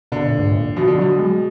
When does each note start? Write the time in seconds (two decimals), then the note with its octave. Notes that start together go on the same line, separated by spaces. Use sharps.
0.12 B2 D3
0.26 A#2
0.39 G#2
0.52 A#2
0.76 B2 F3
0.88 D3
0.99 B2 F#3
1.19 G#3